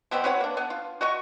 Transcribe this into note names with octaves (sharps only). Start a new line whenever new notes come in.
B2 G3 B3 C4
F#4 B4 C#5 F#5
A#3 D4
B3
F4
F#4 D#5 C#6